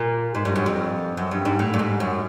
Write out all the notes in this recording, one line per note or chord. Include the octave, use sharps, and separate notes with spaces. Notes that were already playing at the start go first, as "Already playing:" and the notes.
Already playing: A#2
G#2
G2
F#2
F2
F#2
G2
G#2
A2
G2
G#2
F#2